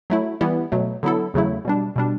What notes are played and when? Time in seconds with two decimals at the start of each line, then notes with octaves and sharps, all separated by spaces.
0.10 F#3 A3 E4
0.41 E3 G3 B3 E4
0.72 B2 F#3 A3
1.03 D3 F#3 B3 E4 A4
1.34 E2 C#3 F#3 A3 E4
1.65 B2 G3 D4
1.96 B2 G3 D4